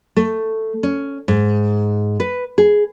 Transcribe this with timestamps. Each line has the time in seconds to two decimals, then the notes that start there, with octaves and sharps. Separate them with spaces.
0.16 A3
0.83 C#4
1.28 G#2
2.20 B4
2.58 G#4